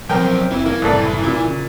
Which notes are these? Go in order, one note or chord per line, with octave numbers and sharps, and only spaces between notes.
B1 F3 F#3 C4 A#4 G5
F#1 E3 C4 E4
E3 A#3
F#1 C2 A2 A4 D5
A#2
C#3